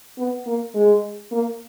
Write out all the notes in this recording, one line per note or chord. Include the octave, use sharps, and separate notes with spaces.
B3
A#3
G#3
A#3